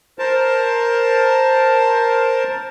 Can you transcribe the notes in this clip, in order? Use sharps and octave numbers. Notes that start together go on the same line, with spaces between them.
A#4 C5 A5